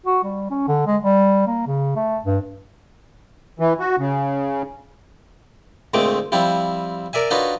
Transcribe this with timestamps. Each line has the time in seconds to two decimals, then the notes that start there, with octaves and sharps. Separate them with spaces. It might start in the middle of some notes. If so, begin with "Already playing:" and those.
0.07 F#4
0.24 G3
0.50 C#4
0.68 D3
0.87 G#3
1.02 G3
1.47 A#3
1.67 C#3
1.96 A3
2.24 G2
3.60 E3
3.80 F#4
3.99 C#3
5.94 D2 A#2 G#3 A3 C4 D6
6.32 F3 G3 C4 E4 F4
7.13 A#4 D5 E5 G#5
7.31 D4 D#4 F4 F#4 B4 C#5